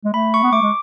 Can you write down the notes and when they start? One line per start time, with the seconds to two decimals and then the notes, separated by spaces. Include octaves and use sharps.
0.05 G#3
0.14 A3 B5
0.34 C#6
0.43 B3
0.52 A3 D6
0.62 G#3